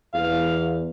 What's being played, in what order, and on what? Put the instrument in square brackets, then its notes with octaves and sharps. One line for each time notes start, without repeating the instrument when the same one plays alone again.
[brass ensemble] E2 [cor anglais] F5